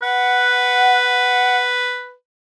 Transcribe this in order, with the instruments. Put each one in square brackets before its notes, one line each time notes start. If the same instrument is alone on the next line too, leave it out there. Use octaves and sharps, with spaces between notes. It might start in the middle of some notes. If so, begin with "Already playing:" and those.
[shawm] B4 [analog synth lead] F#5